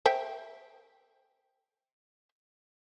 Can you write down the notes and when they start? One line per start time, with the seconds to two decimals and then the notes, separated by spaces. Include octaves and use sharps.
0.06 C5 E5 G5